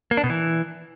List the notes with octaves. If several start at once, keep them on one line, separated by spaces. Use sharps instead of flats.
A#3
D4
B2
E3